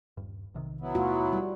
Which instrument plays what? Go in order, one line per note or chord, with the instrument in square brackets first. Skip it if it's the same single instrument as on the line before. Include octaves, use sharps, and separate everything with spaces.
[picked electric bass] D#1 G2
B1 C3 D#3
[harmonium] F#3 B3 E4
[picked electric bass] D#2 B2 A3 [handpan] F4 F#4
[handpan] G3